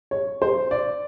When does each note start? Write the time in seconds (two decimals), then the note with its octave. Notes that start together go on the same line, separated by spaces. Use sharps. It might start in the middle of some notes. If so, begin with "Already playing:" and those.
0.11 C#5
0.42 C5
0.71 D5